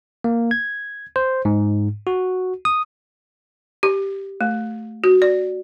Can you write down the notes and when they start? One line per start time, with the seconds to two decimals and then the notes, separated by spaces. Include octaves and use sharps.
0.24 A#3
0.51 G#6
1.16 C5
1.45 G#2
2.07 F#4
2.65 D#6
3.83 G4
4.41 A3
5.04 F#4
5.22 D5